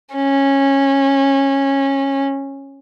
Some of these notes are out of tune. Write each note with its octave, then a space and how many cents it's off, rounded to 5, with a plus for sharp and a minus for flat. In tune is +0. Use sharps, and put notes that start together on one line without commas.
C#4 -15